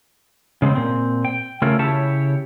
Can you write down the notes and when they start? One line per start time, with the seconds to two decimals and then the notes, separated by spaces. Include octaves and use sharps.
0.62 C#3 G#3 B3 C4
0.75 A#2 C4
1.25 G5
1.62 C#3 A3 C#4 F4 A4 A#4
1.79 C#3 E4 G4 C#5 A5